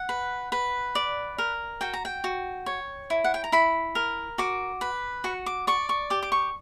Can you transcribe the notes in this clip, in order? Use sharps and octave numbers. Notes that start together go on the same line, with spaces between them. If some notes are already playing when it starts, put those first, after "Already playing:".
Already playing: F#5
B4
B4
D5
A#4
F#4 G5
A#5
G5
F#4
C#5
E4
F#5
G5
A#5
E4 B5
A#4
F#4 D6
B4
F#4 C#6
D6
D5 C#6
C#6
G4 D6
D6
C#6